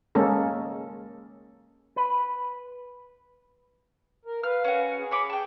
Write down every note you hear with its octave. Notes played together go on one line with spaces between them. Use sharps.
G#3 A#3 C#4 A4
B4
A#4
B4 F5 F6
C#4 F#4
G#4
C#5 B5 D6
G#4 G5 A5